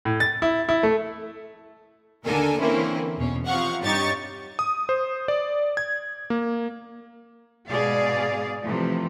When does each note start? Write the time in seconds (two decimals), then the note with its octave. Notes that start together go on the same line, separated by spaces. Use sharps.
0.05 A2
0.20 A6
0.42 E4
0.69 E4
0.83 A3
2.25 D#2 D3 A4 A#4 G#5
2.59 D3 E3 A#3 C4 C#4 E4
3.18 E2 B2 C#4
3.46 C3 F3 F5 F#5 C#6
3.83 G2 D#4 G4 C#5 C#6 A6
4.59 D#6
4.89 C5
5.28 D5
5.77 G#6
6.30 A#3
7.69 G#2 B2 G#4 D5 F5
8.63 C3 E3 F3 A3